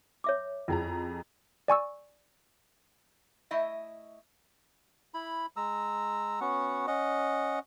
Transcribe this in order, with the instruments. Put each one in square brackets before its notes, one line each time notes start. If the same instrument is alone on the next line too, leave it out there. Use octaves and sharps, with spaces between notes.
[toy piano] C#5 E5 D6
[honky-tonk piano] F2 G#4 A#5 [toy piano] E4
[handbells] D5 G#5 C#6 E6
[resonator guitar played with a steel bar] A3 E4 D#5 E5
[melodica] E4 B5
G#3 A#5 E6
B3 C#4 F#4 F#5
C#4 D#5 F#5